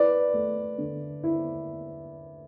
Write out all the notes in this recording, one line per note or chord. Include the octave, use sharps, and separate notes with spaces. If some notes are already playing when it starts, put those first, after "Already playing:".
Already playing: E4 B4 D5
A3
D3
E4